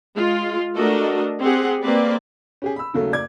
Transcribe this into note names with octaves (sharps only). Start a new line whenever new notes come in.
G#3 F4
A3 D4 F#4 A4 A#4 D#5
C4 G4 G#4 F#5
A#3 C4 B4 D5
C#4 G4 G#4
B5 E6
D#2 C#3 F#3 A3
F#1 D5 D6 G#6